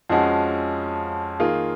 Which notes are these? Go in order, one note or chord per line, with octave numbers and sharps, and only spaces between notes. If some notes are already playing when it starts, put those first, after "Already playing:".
F2 F3 G#3 C#4 F#4
D#3 A#3 F4 G#4